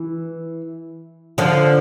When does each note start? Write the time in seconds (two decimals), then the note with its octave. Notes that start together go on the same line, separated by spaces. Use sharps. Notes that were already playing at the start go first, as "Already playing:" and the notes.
Already playing: E3
1.38 D3 F3